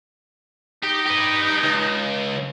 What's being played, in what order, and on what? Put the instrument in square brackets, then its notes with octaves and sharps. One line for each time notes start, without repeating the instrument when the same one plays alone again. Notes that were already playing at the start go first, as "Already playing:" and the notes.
[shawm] D#4 [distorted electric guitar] G4
[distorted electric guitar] G4 B4
C#2